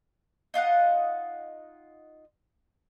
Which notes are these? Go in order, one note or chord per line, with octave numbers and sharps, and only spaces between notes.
D#4 F4 D#5 F#5